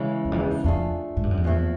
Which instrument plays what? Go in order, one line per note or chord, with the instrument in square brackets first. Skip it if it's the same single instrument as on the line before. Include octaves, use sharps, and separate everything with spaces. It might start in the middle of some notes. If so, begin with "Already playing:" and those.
Already playing: [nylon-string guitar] C#3 E3 G#3 C#4 E4
[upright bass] E2
F2
E2
[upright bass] F2 [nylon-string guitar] A3 D4 F4 G#4
[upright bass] G#2
G2
F#2
F2
[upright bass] E2 [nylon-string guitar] F3 A3 C4 E4